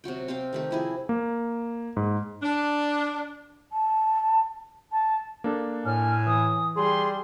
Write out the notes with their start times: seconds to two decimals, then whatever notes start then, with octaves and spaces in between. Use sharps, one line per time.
0.04 C3 F#3 F#4 G5
0.28 C4 G4 F5 G5
0.53 D#3 A3 G4
0.71 F3 E4 G#4
1.09 A#3
1.97 G#2
2.43 D4
3.73 A5
4.92 A5
5.44 A#3 D4 A4
5.86 A2 G#5 F6
6.27 E3 D#6
6.76 G3 G#4 C6